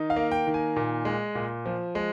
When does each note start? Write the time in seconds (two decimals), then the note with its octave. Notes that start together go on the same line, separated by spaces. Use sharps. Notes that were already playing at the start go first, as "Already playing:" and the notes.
Already playing: D#3 D#4
0.10 F5
0.16 A#3
0.32 G5
0.47 D#3
0.54 G#5
0.76 A#2
1.05 G#3
1.35 A#2
1.66 F3
1.95 G#3